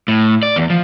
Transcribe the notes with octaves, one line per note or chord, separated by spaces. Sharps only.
A2
D5
E2
F3